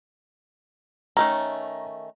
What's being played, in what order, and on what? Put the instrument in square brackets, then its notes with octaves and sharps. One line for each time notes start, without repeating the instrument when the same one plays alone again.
[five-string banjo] D#3 A3 C#4 [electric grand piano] A#5